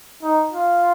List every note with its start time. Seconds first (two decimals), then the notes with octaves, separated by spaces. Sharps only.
0.23 D#4
0.51 F4